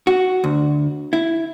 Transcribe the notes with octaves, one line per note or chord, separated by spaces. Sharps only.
F#4
D2
E4